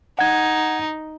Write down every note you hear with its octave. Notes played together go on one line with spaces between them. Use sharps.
D#4 F#5 G#6